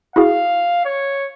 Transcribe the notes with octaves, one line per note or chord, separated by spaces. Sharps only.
E4 F#4 G#4 F5
C#5